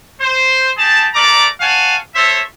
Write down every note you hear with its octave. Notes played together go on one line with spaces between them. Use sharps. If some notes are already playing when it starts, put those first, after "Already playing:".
C5
G4 G#4 A5
A3 A#4 D5 A#5 D6
C#5 F5 F#5 G#5 A5
A4 C5 C#5 E5